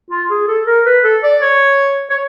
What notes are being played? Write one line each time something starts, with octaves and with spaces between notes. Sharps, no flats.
F4
G#4
A4
A#4
B4
A4
D5
C#5
C#5